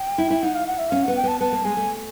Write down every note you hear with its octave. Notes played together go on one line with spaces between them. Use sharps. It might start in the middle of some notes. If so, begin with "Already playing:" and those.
Already playing: G5
E4
E4
D#4 F#5
F5
F#5
E5
C#4 F5
B3 F#5
G5
B3 A5
B3 A5
A#3
G#3 G#5
A3